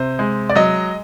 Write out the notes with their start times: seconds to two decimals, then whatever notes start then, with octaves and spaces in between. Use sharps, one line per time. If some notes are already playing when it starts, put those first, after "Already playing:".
Already playing: C3 C5
0.19 G#3
0.50 D5
0.55 F#3 D#5